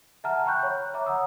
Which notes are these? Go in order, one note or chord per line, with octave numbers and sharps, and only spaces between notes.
E5 F#5 A5 A#5 F6
G5 A#5 B5 C#6 F#6 G6
C#5 B5
C#5 E5 A#5 D6
F#5 A#5 D#6 E6